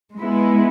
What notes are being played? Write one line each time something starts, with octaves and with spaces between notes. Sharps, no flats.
G#3 B3 E4